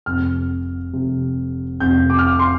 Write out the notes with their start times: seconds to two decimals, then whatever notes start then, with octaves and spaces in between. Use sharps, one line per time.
0.06 F1 F2 C3 F6
0.93 F1 F2 C3
1.80 F1 F2 C3 G6
2.10 D6
2.19 F6
2.27 D6
2.39 C6